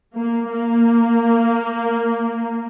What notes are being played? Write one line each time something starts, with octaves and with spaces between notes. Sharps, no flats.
A#3
A#3